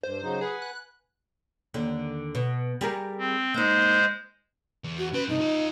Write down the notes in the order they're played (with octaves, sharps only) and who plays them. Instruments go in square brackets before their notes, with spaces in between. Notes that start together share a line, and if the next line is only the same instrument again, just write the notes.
[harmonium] G2 [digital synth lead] C5
[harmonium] C#3 F#3 D#4
[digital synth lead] G#4 [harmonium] B4 F#5 G#5
[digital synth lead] F#6
[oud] D#2 D3
B2
G3 G#4 A#4
[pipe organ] C4
[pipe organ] G#3 C5 G6 [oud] A#3 D#4
[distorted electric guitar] E2
[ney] F#4
[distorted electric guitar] C#4 C6 [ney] B4
[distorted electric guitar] G2 C3 [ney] D#4
[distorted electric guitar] F4 D#5